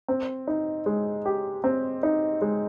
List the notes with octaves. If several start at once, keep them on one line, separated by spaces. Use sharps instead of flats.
C4
D#4
G#3
G4
C4
D#4
G#3